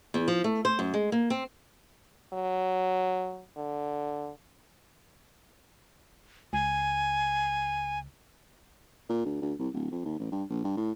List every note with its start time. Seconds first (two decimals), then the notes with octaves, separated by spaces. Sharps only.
0.14 E2
0.28 F3
0.44 A3
0.65 C5
0.79 F#2
0.94 G#3
1.12 A#3
1.30 C4
2.33 F#3
3.57 D3
6.53 C#2 G#5
9.10 A#2
9.26 D2
9.42 D2
9.59 C2
9.74 D1
9.91 F2
10.05 D#2
10.20 A1
10.32 G2
10.50 A#1
10.64 G2
10.77 A2